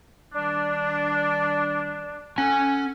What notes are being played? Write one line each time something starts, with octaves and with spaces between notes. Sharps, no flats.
D#3 G3 D4
C#4 A4 F#5 G#5